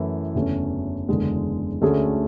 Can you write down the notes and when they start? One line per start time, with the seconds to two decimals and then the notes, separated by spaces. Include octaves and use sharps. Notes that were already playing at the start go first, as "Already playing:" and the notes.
Already playing: F#2 E3 A3 E4
0.34 F#1 E2 D3 A3 C#4
1.08 F#1 E2 D3 G#3
1.82 D2 D3 A3 C#4 G#4